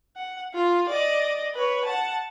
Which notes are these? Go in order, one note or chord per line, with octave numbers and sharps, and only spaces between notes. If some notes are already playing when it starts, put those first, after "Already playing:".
F#5
F4
D5 D#5
B4 C#5
F#5 A5